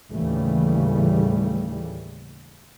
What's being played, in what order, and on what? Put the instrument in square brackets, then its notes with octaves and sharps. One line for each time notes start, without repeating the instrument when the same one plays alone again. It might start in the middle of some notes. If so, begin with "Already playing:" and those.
[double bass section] D#2 A2 C#3 E3 G3 A3